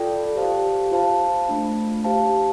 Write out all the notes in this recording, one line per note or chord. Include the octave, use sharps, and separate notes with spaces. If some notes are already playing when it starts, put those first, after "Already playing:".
Already playing: F4 A4 D5 G5
G4 C5 F5 A5
F4 C5 F5 A5
A3 D4 F4
G4 C5 F5 A5